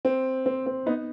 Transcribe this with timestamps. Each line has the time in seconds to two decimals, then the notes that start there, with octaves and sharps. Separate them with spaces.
0.05 C4
0.46 C4
0.66 C4
0.86 B3 D#4